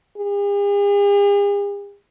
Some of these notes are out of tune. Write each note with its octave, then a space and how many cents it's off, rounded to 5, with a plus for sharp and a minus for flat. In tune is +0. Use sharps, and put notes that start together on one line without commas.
G#4 -45